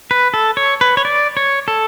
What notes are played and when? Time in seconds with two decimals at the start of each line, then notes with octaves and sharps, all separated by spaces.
0.11 B4
0.34 A4
0.57 C#5
0.81 B4
0.97 C#5
1.05 D5
1.37 C#5
1.68 A4